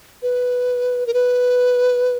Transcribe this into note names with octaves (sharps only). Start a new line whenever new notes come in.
B4
A#4
B4